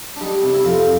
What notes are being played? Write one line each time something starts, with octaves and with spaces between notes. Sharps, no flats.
D4
G3 D#4
C3
E4
F2 F4